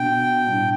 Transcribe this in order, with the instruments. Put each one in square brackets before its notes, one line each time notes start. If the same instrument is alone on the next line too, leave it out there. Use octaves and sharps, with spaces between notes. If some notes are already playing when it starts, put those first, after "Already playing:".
Already playing: [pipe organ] B2 B3 D4 [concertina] G5
[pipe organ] A2 G3 D4